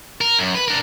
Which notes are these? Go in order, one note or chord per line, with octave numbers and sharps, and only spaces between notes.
A#4
F#2
B4
D4 A#4